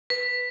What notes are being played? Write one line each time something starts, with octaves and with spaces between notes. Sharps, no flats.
B4